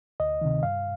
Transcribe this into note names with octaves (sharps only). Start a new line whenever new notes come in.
D2 D#5
C3 D#3
G2 F5